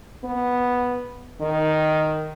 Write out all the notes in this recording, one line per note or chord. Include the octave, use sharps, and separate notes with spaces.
B3
D#3